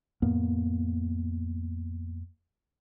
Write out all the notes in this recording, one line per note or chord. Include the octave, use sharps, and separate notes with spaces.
F2 A2 A#3 B3